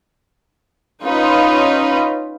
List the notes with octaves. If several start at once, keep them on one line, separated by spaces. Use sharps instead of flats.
C#4 D#4 F4 B4